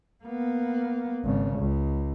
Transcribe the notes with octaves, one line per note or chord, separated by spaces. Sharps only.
A#3 B3
G#1 C#3
C#2